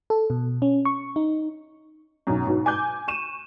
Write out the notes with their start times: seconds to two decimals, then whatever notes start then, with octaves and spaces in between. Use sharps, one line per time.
0.10 A4
0.30 B2
0.62 C#4
0.85 C#6
1.16 D#4
2.27 B1 F#2
2.47 G#2 B2
2.66 G#5 D6 G6
3.08 C#6 D#7 E7